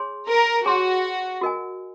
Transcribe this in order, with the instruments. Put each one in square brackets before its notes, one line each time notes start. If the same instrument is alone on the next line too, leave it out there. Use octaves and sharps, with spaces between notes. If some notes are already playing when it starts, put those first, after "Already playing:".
Already playing: [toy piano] G#4 C#5 G#5 C6
[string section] A#4
[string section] F#4 [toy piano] G#4 C#5 G#5 C6
[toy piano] F#4 A#4 D#5 G#5